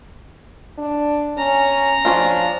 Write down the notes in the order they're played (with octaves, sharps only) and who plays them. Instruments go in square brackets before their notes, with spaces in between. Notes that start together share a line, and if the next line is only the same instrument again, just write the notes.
[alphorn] D4
[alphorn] C#4 [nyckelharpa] A#5
[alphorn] F3 [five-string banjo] C#4 D4 F4